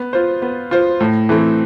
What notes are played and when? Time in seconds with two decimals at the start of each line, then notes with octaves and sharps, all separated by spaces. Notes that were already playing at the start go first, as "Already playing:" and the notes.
Already playing: B3
0.13 F4 C5
0.42 B3
0.71 F4 C5
1.00 A2
1.29 E3 A3 C4